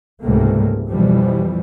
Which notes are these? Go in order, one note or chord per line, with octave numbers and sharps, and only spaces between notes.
C#2 G#2 C3 G3 A3 A#3
F2 B2 E3 F3 G3